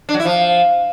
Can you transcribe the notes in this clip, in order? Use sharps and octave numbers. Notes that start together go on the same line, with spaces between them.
D4
F#3
E4
F3